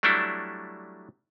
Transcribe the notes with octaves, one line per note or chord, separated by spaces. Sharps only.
F#3 G3 A3 D4 E4 A4